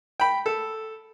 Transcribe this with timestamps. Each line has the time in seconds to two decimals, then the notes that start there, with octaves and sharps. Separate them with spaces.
0.20 G5 B5
0.46 A4